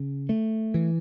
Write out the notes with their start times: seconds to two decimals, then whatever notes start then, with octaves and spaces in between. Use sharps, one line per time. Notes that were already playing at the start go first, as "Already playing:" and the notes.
Already playing: C#3
0.29 A3
0.74 E3